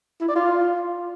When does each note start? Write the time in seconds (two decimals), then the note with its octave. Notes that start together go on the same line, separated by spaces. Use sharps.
0.21 E4
0.28 D5
0.35 F4